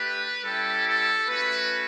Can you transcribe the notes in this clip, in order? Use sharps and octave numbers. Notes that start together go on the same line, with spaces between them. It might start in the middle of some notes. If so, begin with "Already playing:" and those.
Already playing: A3 D4 G4 B4
G3 C#4 E4 G4 A4
A4
A3 C#4 F#4 B4